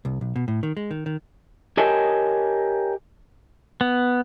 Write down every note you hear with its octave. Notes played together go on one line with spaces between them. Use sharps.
C2
B1
B2
A2
D#3
G#3
D#3
D#3
G4 A#4 C#5 D#5 G#5 A5
B3